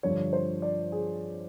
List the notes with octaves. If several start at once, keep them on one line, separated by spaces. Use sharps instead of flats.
G2 D3 F3 C#5
C5
D5
G#4